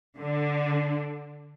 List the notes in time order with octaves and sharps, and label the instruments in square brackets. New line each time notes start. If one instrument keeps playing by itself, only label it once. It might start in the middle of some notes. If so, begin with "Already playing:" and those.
[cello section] D3